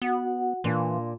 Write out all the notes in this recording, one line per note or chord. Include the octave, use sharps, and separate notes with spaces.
B3 F#4 F#5
A#2 E3 D4 F5 C6